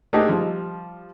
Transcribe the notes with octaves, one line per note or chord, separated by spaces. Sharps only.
A3 A#3 D4 D#4 G4 G#4
F3 G3